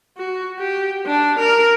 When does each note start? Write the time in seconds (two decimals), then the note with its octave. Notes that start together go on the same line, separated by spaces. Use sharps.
0.17 F#4
0.59 G4
1.06 D4
1.39 A#4